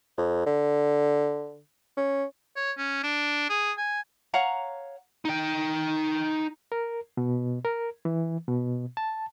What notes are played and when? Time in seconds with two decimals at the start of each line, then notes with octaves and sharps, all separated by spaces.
0.17 F2
0.46 D3
1.97 C#4
2.56 C#5
2.78 C#4
3.04 D4
3.50 G#4
3.78 G#5
4.34 C#5 F5 F#5 A#5
5.25 D#4 G5
6.72 A#4
7.17 B2
7.65 A#4
8.05 E3
8.48 B2
8.97 A5